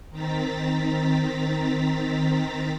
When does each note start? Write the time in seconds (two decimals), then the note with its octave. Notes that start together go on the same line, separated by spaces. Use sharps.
0.10 D#3 C4 A#5 A6 B6